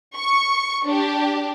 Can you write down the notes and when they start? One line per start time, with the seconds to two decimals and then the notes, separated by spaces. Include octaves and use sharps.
0.16 C#6 C#7
0.86 D4 G4